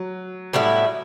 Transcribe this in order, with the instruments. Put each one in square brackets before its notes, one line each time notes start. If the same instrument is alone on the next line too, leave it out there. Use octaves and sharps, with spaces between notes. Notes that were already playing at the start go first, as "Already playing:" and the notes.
Already playing: [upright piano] F#3
[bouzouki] A2 G3 B3 E4